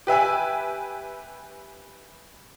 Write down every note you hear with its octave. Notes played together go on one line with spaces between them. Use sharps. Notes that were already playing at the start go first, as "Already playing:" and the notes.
G4 B4 E5 G#5